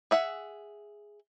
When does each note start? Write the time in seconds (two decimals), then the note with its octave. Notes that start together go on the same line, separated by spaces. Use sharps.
0.11 G#4 E5 F#5